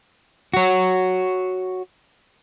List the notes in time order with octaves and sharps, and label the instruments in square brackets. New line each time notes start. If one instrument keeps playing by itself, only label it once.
[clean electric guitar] F#4 C#5